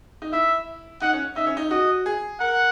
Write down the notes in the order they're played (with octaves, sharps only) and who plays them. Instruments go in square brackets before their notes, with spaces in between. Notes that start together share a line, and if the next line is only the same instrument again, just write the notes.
[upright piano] D#4
[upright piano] E4 [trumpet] E5
[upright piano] D#4 [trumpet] F#5
[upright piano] C#4
[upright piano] D#4 [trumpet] E5
[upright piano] C#4
D#4
[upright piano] F#4 [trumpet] D#5
[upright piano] G#4
[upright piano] A#4 [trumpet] F#5